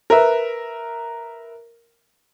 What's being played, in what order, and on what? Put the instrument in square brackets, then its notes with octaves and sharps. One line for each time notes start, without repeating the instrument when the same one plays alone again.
[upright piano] A#4 B4 E5